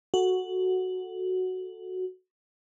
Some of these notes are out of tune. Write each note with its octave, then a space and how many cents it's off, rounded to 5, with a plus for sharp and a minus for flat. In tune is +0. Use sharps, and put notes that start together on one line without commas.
F#4 +0 A4 +0